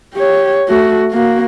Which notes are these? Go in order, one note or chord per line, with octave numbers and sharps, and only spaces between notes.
G4 C#5
A3 F#4
A#3 F#4